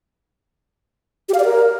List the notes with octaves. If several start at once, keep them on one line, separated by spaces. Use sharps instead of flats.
G4
F5
D5
A#4